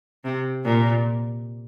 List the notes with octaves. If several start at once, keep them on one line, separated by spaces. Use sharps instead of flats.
C3
A#2